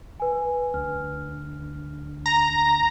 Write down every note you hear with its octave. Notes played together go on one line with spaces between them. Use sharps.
B4 G#5
D2 F6
A#5